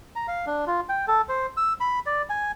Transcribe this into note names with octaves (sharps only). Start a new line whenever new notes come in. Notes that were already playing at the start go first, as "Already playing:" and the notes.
A#5
F5
D4
F4
G5
A4
C5
E6
B5
D5
G#5